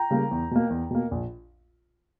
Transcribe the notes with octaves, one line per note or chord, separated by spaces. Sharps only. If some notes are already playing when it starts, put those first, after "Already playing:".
Already playing: G5 A#5
C#3 G3 A#3
E2
B2 A#3
E2
B2 A#3
A#1